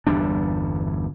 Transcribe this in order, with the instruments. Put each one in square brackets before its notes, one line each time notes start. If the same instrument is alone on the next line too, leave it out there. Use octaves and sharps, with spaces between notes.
[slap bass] G1 E2 G3 D4